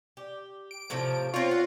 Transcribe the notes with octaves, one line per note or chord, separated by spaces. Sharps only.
G4
D7
A2 C3 F3
C4 F4 C#5
F#5